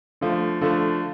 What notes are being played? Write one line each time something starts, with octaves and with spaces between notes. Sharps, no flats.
D3 F3 A3
D3 F3 A3